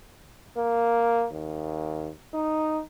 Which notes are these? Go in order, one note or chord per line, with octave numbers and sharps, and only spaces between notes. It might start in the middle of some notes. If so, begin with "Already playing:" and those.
A#3
D#2
D#4